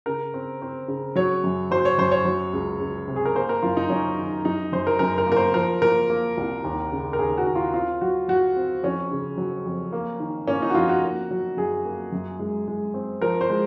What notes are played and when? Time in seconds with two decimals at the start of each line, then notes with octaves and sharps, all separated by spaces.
0.06 C#3 A#4
0.34 C4
0.62 C4
0.88 C#3
1.16 F#3 C#5
1.44 F#2
1.71 F#3 C5
1.85 C#5
1.98 F#2 C5
2.11 C#5
2.25 F#3
2.53 C#2
2.80 C#2
3.08 C3
3.16 G#4
3.25 A#4
3.35 A#3 C5
3.49 A#4
3.62 F#2 F4
3.77 D#4
3.90 F#2 C#4
4.18 D#3
4.45 F#2 D#4
4.73 F#2 C5
4.87 A#4
4.99 F#2 A#4
5.18 A#4
5.27 A#3
5.32 A#4
5.36 C5
5.54 F3 A#4
5.82 A#3 A#4
6.10 A#3
6.37 C2
6.64 D#2
6.92 C#3
7.13 A#4
7.19 D#2 G#4
7.38 F#4
7.47 D#2
7.55 F4
7.73 C4 F4
8.01 F#3 F#4
8.28 F#3 F#4
8.56 C4
8.83 F2 C#4
9.11 C#3
9.38 F#3
9.65 F2
9.92 A#3
10.20 D#3
10.47 A#3 C#4
10.62 D#4
10.70 F#4
10.75 F2 F4
10.89 F#4
11.03 A#3
11.31 F#3
11.57 F#2 G#4
11.85 A#3
12.12 F#2
12.39 G#3
12.68 G#3
12.94 C4
13.22 F3 A#4
13.41 C5
13.50 G#3